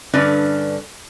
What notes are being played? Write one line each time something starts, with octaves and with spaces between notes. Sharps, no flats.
G2 D3 C#4 B4 D5